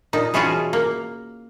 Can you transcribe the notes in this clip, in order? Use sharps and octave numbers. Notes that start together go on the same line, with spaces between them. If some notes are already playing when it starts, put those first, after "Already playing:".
A#2 D#4
B2 E3 C#4 F4 F#4 G#4
A#3